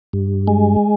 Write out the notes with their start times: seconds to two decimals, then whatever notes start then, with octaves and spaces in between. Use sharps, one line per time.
0.13 G2
0.48 G#3